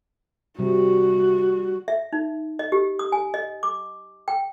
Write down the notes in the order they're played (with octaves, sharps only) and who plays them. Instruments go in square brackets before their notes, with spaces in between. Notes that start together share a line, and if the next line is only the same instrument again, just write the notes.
[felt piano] C3 [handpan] G3 [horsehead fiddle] F#4
[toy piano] E5
D#4
D#5
G4
D#6
G#5
D#5
D6
G5